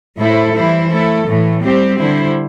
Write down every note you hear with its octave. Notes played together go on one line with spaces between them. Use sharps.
A2 A3 E4 A4 C5
E3 G3 E4 C5
A3 E4 A4
A2 E3 A3
G3 C4 G4 C5
D3 G3 E4 C5